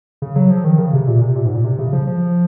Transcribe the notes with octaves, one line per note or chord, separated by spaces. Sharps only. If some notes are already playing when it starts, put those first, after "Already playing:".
C#3
F#3
F3
D#3
C#3
C3
A#2
C3
A#2
G#2
A#2
C3
C#3
F3
F3